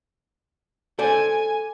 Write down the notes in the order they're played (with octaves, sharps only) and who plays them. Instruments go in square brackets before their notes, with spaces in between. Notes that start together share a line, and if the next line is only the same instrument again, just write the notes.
[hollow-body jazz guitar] A4 C5 D5 [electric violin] G#5